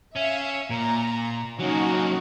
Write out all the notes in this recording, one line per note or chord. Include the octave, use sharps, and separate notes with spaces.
C#4 E5 F5
A#2 A#5
F#3 A#3 C#4 D#4 F#4